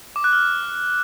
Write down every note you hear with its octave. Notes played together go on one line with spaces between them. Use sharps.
D6
F#6
F6